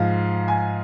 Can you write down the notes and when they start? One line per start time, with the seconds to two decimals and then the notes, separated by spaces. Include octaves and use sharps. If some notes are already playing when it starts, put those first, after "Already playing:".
Already playing: G#2 F3 F5
0.48 G#5